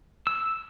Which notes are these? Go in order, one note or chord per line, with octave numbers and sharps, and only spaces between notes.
E6